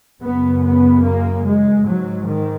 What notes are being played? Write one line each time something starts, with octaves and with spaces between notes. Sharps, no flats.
F#2 C#3 B3
B3
A#3
G#3
G#2 F#3
D#3